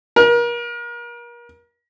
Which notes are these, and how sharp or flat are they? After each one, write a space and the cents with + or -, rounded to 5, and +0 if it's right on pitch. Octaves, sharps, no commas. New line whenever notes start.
A#4 +35